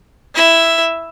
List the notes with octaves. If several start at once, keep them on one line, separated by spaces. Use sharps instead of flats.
E4 E5